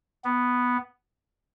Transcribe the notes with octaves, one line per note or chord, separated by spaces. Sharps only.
B3